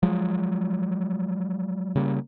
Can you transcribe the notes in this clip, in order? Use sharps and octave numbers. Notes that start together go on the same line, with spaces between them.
F3 F#3 G#3
C#3 G3 A#3